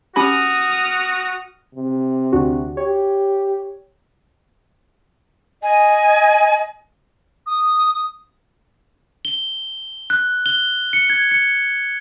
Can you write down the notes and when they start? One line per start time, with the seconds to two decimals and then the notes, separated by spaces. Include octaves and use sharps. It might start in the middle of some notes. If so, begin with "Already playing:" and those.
0.16 C#4 F#4 G4 B5 D#6 F6
1.75 C3
2.32 D2 D4 F#4
2.77 G4 C#5
5.63 D#5 G#5
7.46 D#6
9.25 G7
10.10 F#6
10.46 G7
10.93 C#7
11.10 G#6
11.31 C#7